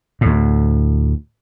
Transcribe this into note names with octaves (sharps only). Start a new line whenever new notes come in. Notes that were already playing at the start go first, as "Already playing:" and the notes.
D2 A2